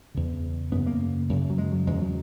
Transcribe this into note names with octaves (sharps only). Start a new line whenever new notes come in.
E2 C#3
F#2 C#3 B3
A#3
F#2 C#3
F#3
G#3
F#3
E2 C#3 G#3
F#3